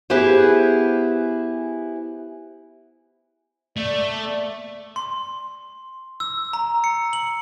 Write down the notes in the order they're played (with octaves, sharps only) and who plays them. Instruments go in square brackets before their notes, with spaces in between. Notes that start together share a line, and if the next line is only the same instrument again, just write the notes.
[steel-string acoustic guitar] B3 E4 G4 G#4 B4 C5
[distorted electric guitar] A3 [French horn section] D5
[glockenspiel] C6
E6
A#5
C#7
F#7